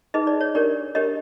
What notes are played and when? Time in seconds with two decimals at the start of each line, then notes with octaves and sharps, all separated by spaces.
0.14 D#4 G#4 B4 D#5
0.27 D5
0.41 C#5
0.55 D4 G4 A#4 C#5 D5
0.95 D4 G4 A#4 C#5 D#5